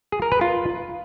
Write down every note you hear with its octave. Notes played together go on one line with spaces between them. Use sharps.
G#4
A#4
B4
F4